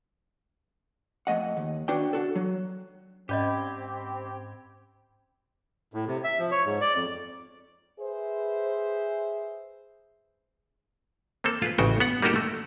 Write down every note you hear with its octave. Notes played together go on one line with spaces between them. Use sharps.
F2 A3 D#5 F#5
D#2
D4 F#4 B4 C#5 G5
D4 F#4 A4
F#3
G#2 C4 C#4 G4 D5 D#5 B5 G#6
A2
C3
E5
F3
C#5
G#2
D5
F2
G#4 B4 C5 E5
A#3 C4 A4
F4 G#4 B4
A1 C#3 F#4 G5
B3 F#5
G3 A#3 D#4 F#4 G4 A4
A3